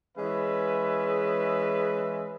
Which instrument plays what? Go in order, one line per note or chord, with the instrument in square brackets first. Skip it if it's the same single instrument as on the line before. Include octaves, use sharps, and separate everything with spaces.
[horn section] E3 G#3 C#4 G#4 B4 E5